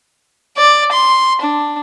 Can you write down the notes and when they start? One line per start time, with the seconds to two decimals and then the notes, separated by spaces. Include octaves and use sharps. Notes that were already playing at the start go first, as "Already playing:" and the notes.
0.57 D5
0.92 C6
1.41 D4